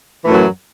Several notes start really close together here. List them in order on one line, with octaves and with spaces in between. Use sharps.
E3 A2 F#2 F#3